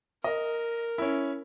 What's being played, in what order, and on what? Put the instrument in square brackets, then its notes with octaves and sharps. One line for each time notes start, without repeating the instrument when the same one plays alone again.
[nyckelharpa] A#4 [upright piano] D#5
[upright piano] C#4 E4